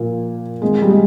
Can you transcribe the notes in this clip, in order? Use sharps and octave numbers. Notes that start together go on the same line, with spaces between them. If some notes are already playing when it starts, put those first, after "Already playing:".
Already playing: A#2 F3 A#3
C3 D#3 G#3
G3
G#3